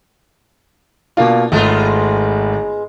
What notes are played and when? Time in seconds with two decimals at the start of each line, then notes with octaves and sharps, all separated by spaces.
1.17 B2 A#3 D4 F4
1.52 G#1 G#3 A3 B3 F4